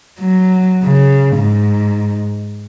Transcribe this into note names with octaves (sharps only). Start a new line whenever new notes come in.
F#3
C#3
G#2